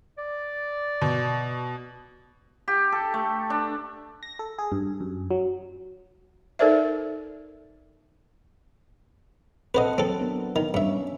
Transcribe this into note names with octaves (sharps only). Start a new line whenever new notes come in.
D5
B2
G4
A4
A3
D4
A#6
A4
G#4
G2
F#2
F#3
D#4 A4 A#4 C5 D5 E5
C4 A4 B4 C5 D#5 F#5
F#3 C4 A4
B3 D4 A#4
D#3
G2 C#4 C#5 E5